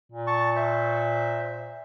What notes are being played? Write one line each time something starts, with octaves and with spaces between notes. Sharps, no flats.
A#2
A5 C#6
C5 E5